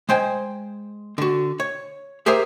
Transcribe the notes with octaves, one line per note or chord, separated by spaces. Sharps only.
G#3 C5 G5 G#5
D3 F#4
C#5
G4 G#4 A#4 C5 E5